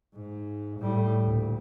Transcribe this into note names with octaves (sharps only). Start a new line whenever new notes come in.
G#2
A2 G3
D2 A#2